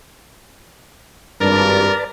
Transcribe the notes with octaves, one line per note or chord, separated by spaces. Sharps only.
G#1 G2 A#4 B4 D5 A5